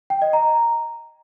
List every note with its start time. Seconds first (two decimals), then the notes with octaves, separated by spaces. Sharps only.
0.10 G5
0.22 D#5
0.33 A#5